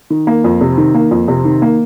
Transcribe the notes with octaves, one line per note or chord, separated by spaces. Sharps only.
D#3
A#3
F2
C3
D#3
A#3
F2
C3
D#3
A#3